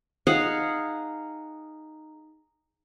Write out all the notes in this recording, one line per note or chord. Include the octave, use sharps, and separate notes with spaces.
D#4 G#4 F5 F#5